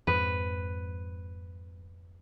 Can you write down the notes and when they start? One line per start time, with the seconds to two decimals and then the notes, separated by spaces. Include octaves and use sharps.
0.07 F2 G#2 F3 B4